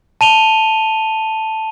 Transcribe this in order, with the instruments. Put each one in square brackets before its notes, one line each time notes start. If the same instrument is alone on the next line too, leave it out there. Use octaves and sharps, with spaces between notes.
[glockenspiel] A5 D#7 F7 G7